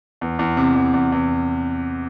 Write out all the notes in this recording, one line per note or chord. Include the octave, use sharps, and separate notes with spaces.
E2
E2
C3
E2
E2
E2